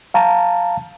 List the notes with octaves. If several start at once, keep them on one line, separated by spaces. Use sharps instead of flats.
F5 A5 A#5